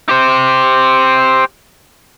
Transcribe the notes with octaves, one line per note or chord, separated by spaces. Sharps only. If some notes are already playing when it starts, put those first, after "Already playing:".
G4 C5